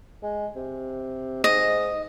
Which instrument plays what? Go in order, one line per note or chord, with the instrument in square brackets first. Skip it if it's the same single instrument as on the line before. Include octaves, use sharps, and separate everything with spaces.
[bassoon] G#3
C3
[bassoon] G#2 [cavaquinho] D#5